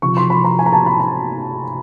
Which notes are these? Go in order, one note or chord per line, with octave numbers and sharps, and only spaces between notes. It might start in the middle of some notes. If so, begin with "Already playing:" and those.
C3 F3 C#6
C6
B5
A#5
G#5
A#5
A5
B5
A#5